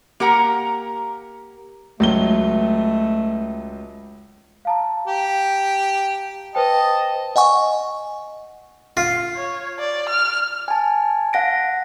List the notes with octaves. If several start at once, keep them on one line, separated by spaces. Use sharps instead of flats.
A#3 G4 A#4 F#5 A#5
C#2 F#3 A3 G7
F5 A5 A#5
G4
B4 C5 D#5 G5 A5
D#5 F#5 G#5 C#6
F4
C#5
D5
F6
G#5 A5
F5 F#5 A#6 D7